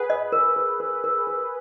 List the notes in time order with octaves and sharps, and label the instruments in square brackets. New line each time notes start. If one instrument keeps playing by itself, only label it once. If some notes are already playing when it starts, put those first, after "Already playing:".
Already playing: [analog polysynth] G#4 B4 [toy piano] F#5
[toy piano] D#5
A#4
A#4
A#4
A#4
A#4